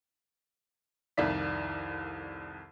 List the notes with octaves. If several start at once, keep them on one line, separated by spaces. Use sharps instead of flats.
C2 F2 D#3 D5 B6